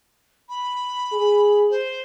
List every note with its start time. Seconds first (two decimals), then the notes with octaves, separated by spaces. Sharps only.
0.49 B5
1.12 G#4
1.70 C5